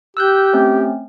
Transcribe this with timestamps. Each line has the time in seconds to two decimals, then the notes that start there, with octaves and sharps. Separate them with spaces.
0.17 G4 E6 F#6 G6
0.53 A3 C4 C#4